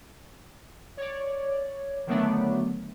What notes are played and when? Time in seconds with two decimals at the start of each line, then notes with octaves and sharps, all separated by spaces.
0.97 C#5 D5
2.07 D3 D#3 F#3 A3 B3 D4